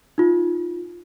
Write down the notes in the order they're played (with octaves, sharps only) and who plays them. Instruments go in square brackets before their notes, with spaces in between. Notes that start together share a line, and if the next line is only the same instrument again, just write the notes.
[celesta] D#4 F4